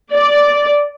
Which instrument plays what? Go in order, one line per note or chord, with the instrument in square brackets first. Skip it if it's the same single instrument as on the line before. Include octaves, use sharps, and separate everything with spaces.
[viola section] D5